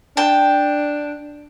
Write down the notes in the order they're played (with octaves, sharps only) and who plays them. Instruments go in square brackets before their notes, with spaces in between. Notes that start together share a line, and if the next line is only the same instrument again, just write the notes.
[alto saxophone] D4 [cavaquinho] G5 A5